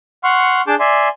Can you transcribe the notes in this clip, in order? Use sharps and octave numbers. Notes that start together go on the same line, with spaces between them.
F#5 C6 C#6 F6
D4 G#4 A5 D6 G6
D5 E5 G#5 C6